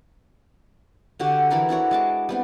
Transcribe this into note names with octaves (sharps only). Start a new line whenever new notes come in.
D3 F#4 G4
E3 E4 A4 A#4
D4 E4 F#4 C#5
G#3 A5 D6
G3 B3 C4